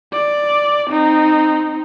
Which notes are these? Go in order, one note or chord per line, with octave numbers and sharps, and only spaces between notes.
D5
C4 D#4